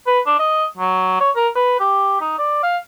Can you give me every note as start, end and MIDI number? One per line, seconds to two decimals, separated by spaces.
0.07 0.20 71
0.26 0.39 62
0.39 0.65 75
0.77 1.19 54
1.20 1.31 73
1.36 1.48 70
1.55 1.77 71
1.80 2.17 67
2.21 2.38 63
2.38 2.59 74
2.63 2.78 77